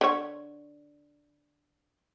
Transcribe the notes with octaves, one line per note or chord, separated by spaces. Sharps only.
D3 C#5